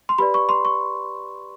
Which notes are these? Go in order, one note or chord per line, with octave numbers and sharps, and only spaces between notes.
C6
G4 B4 D5 B5
C#6
C6
C#6